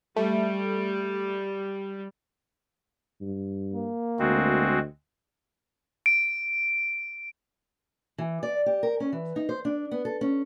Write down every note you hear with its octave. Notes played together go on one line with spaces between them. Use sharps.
G3 A3
G2
A#3
D2 G#3 C4 F#4
D7
E3
D5
G4
A#4
C#4
E3
D#4
C5
D4
B3
A4
C#4